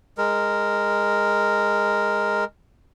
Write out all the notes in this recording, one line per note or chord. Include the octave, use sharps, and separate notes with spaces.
G#3 A#4